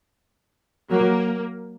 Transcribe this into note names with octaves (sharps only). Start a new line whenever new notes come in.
F#3 A#3